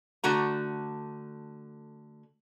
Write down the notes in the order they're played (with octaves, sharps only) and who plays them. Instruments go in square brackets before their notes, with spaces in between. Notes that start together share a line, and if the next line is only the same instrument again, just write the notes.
[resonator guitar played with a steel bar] D3 A3 F#4 A#5